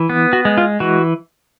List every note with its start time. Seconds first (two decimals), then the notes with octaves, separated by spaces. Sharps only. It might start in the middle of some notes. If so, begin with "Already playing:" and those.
Already playing: E3
0.10 B3
0.33 F#4
0.45 G#3
0.58 F4
0.80 E3 F#4